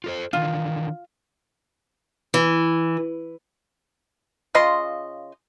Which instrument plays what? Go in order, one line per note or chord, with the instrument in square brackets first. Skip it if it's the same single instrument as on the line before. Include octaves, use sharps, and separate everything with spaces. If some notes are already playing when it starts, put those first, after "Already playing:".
[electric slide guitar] F4 A4 C5
[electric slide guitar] D#3 E3 D4 [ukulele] F4
[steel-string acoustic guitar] E3
[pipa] C#3 F4 D#5 C6